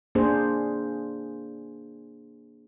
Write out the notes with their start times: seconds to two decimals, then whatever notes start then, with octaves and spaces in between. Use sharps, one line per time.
0.15 A#3 D4 G#4 C5